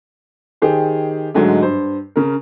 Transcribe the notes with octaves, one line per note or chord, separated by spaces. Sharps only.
D#3 G4 G#4 C5
G#2 D3 F#3 G#3 A3
G2 C5
C#3 A#4